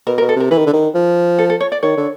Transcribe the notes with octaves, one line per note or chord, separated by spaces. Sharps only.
B2 A#4
A#4
B2
A4
C3 A#4
E3 B4
D#3
D3
D#3
F3
A4
A4
C#5
D5
D#3 C#5
D3